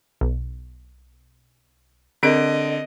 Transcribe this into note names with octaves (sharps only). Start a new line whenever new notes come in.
B1
D3 C4 G#4 A#4 D#5 D7